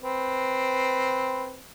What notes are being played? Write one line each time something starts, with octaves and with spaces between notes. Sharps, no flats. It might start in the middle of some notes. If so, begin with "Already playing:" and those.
C4 B4